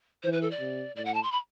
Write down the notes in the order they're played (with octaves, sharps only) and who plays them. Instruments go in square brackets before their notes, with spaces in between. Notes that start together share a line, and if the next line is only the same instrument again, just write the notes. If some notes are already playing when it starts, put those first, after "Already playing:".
[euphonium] E3 [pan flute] C5
[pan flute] B4
A4
D5
[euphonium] C3
[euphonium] A2 [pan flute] D5
[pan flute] F#5
A5
C6
B5